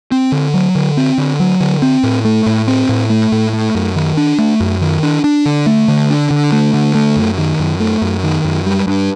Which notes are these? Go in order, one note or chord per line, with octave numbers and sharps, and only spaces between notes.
C4
D3
F#3
D3
C4
D3
F#3
D3
C4
A2
A3
A2
C4
A2
A3
A2
A3
F#2
D#3
D4
A3
F#2
D#3
D4
D4
D3
A3
D3
D4
D3
A3
D3
A3
F#2
D#3
F#2
A3
F#2
D#3
F#2
G3
G2